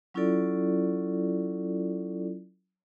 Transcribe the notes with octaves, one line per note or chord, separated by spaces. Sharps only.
F#3 C#4 E4 F4 A4 D5